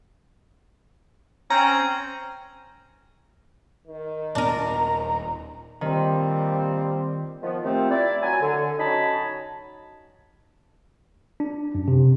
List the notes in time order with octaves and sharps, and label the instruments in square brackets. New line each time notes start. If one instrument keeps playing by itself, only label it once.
[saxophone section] C4 C#4 [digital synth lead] A#5
[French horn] D#3
[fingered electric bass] D#1 A#2 B3 [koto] D4 A#4 [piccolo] A#5
[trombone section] A#2 G3 C4 [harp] D#3
[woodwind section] D#3 F3 B3
C3 D#3 F3 A3 C4
E4 D5
F#3 G#5
D3
F#3 C#4 D#4 C#5 A5 B5
[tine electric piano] D4
F#2
C3